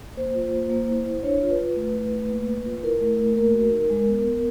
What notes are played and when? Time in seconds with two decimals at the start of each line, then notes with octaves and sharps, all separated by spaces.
0.17 A#3 C5
0.34 F4
0.53 A#3
0.70 A#3
0.88 E4
1.06 E4
1.23 D4 C#5
1.41 F4
1.50 B4
1.59 F4
1.76 A3
1.95 E4
2.12 A3
2.30 A#3
2.48 A#3
2.65 F4
2.83 E4 A#4
3.01 A3
3.19 A3
3.36 A#3 A#4
3.54 F#4
3.72 D#4
3.90 G#3
4.08 B3
4.26 B3